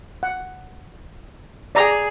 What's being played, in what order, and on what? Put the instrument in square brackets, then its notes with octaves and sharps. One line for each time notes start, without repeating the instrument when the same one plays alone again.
[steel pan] F#5
[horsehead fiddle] G#4 [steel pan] D5 A#5